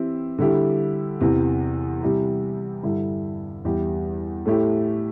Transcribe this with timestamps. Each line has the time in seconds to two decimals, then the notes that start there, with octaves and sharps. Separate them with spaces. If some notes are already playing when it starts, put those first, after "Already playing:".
Already playing: E3 C4 E4 G4
0.38 D3 G3 E4 G4
1.20 E2 C3 E3
2.01 C3 G3 E4 G4
2.83 G2 D3 G3 E4
3.65 E2 E3 G3 E4 G4
4.46 A2 A3 E4 G4